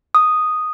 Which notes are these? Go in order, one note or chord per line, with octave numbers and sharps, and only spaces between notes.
D#6